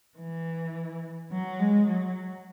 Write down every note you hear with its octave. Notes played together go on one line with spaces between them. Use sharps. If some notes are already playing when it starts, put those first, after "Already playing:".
E3
F#3
G#3
F#3